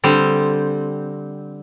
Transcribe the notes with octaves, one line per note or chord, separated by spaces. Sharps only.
D3 G3 C4